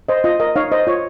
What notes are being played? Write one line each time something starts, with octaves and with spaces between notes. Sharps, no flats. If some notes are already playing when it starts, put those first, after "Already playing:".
C5 D#5
F4 D#5
A#4 D#5
D#4 C#5 F5
C5 D#5
F4 C#5